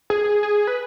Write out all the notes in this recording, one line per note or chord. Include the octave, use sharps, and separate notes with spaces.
G#4
G#4
B4